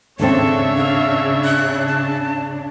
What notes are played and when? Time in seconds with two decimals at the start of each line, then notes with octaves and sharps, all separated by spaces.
0.20 D#2 G#2 C#3 C4 D4 A4 C#5 E5
0.77 F5
1.44 F#6
1.87 A5